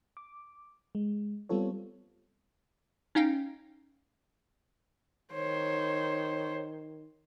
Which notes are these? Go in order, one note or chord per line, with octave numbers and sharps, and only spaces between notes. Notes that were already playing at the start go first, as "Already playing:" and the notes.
D6
G#3
G3 B3 C4 F4 A4 C#5
C#4 D#4 F5 G5
D#3 C5 C#5